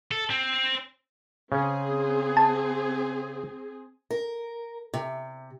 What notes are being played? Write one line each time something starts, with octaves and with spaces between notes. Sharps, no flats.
A4
C4
C#3 C4 C#4 G#4
A5
A#4
C3